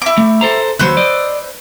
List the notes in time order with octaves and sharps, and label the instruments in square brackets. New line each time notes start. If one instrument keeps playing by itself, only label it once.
[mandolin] E4 D6
[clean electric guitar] A3
A4 C5 A#5
[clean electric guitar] D#2 E3 F#3 [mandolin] B4 C5 E6
[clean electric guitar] D5 D#5